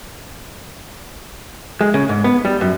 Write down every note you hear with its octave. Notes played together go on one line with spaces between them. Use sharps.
G#3
C#3
G#2
B3
G3
F#2